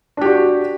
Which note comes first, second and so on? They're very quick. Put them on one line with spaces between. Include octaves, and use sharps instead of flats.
D4 G4 F#4